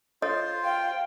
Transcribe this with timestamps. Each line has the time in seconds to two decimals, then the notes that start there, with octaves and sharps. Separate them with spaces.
0.22 F4 A4 C5 C#5 D#5
0.65 F5 G5